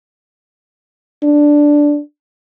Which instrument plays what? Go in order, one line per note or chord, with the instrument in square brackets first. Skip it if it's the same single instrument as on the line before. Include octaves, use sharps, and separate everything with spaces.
[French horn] D4